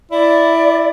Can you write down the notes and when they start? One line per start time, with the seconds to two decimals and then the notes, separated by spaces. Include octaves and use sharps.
0.11 E4 D5